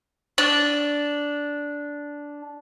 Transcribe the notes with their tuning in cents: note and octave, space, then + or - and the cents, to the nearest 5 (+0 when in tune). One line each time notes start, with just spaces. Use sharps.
D4 -10